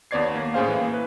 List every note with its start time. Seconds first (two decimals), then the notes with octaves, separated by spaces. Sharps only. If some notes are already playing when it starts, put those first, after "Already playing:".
0.11 D#2 B3 C#5 D5 G#6 C7
0.35 A#3
0.54 A2 C#4 G#4 C5 F5
0.68 E3 A#3
0.94 B4